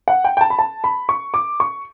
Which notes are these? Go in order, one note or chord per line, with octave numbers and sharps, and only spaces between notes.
F#5
G5
G5
A5
B5
A5
B5
C#6
D6
C#6